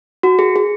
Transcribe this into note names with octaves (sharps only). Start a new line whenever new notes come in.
F#4
G#4
G#4